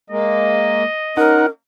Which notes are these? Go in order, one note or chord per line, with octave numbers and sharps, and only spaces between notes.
G#3 A#3 D#5
C#4 D#4 A#4 F#5